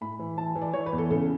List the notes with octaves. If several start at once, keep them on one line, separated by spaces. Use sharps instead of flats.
A2 B5
E3
E3 A5
E3
D5
E3 C#5
B4
E2
A4
C#3 A4